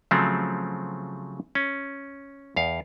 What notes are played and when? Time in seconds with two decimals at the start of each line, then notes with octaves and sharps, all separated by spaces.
0.11 C#3 F3 F#3 A3 C4
1.55 C#4
2.56 E2 F5